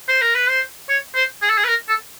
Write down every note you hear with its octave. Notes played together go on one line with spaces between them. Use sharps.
C5
A#4
B4
C5
C#5
C5
G#4
A4
G#4
B4
A#4
A4